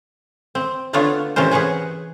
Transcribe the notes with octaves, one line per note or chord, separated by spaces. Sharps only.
C4
D3 A3 B3 D4 F4 C#5
C3 E3 C#4 A#4 C5
G#4 B4 C#5 F#5 G#5